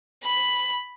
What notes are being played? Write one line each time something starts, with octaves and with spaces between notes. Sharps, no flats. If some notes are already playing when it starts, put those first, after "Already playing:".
B5